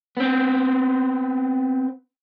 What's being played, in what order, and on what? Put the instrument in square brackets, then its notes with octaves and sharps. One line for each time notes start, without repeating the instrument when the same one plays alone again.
[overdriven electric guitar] B3 C4